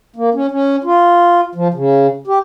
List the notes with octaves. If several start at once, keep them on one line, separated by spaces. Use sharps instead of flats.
A#3
C#4
C#4
F4
F3
C#3
G4